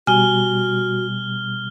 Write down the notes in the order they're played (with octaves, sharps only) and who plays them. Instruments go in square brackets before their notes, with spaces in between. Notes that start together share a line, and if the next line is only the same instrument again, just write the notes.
[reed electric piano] B2 G3 [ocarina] F#4 [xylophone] G#5 [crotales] F6 G7